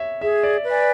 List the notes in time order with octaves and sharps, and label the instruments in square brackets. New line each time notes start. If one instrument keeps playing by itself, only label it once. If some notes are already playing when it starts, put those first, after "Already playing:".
Already playing: [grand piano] C#5 E5
[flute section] G#4 [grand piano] E5
[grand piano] D5
[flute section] B4 D5 G#5